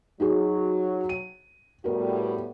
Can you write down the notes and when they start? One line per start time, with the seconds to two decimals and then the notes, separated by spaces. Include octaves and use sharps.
0.20 F#3 D#4 F#4 G#4
1.09 D#7
1.84 A2 G3 B3 F#4 A#4